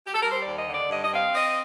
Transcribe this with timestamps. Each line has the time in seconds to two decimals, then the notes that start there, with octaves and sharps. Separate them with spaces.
0.06 G4
0.14 A4
0.22 G3 A#4
0.31 C5
0.40 D5
0.46 D#2
0.56 D#5
0.68 D3
0.74 D5
0.90 G2 D#5
1.03 D#5
1.12 C4 F5
1.34 C4 D#5